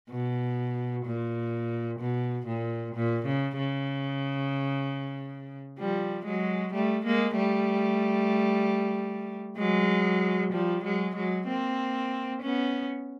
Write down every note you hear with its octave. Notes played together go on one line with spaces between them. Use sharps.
B2
A#2
B2
A#2
A#2
C#3
C#3
F3 G3
F#3 G#3
G3 A3
G#3 A#3
G3 A3
F#3 G#3
F3 G3
F#3 G#3
F#3 G#3
A#3 C4
B3 C#4